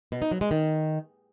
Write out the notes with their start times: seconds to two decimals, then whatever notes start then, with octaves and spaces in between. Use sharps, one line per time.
0.12 B2
0.22 D#4
0.31 F#3
0.41 G#3
0.51 D#3